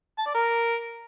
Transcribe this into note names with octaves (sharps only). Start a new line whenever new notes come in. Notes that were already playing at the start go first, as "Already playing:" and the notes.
A5
D5
A#4